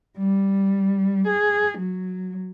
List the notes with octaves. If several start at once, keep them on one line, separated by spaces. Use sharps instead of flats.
G3
G#4
F#3